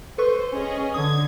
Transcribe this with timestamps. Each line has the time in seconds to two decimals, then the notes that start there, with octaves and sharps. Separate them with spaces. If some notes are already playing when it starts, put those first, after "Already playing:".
0.18 A4 B4 C5 C#6
0.52 C#4 G#4 D#5
0.94 D3 D#6 G#6